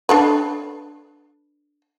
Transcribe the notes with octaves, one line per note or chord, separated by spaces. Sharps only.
D4 A4 B4